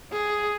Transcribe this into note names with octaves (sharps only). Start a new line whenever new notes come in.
G#4